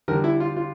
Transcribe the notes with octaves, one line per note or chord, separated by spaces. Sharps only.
D3 G3 A#4
E4
F4
F4